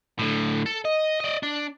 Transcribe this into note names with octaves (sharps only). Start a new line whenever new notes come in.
A2 D3
A4
D#5
D5 D#5
D4